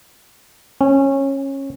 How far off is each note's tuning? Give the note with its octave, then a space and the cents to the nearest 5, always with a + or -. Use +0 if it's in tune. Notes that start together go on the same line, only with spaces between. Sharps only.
C#4 -20